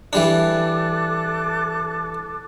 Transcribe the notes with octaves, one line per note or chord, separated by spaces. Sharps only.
E3 G3 D4 A4 D6 F#6